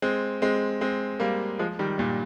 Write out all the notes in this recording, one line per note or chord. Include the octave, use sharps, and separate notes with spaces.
G#3 C4
G#3 C4
G#3 C4
G3 A#3
F3 G#3
D#3 G3
G2 A#2